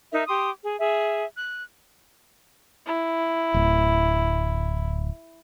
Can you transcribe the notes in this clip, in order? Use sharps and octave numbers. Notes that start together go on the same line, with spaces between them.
D#4 A#4 E5
G4 C6 D6 D#6
G#4
G#4 E5
F#6
E4
D1